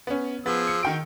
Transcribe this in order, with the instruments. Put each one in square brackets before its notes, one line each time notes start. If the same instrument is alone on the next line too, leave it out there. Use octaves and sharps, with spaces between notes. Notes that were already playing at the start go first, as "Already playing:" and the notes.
[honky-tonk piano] B3 C#4
[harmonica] F3 G#4 E6 [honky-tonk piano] B3
[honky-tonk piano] C#7
[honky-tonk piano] D#3 G5 D7 [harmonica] F#4